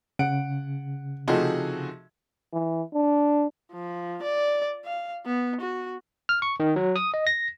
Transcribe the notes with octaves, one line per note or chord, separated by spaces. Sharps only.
C#3 F#5 D7
C3 F3 A3 D#4 F#4 G#4
E3
D4
F3
D5
F5
B3
F#4
F6
C#6
D#3
F#3
D#6
D#5
A#6